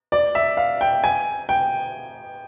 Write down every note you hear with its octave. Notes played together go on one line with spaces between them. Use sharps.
D5
E5
F5
G5
G#5
G5